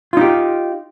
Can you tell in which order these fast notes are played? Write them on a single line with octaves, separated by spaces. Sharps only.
F4 D#4 G4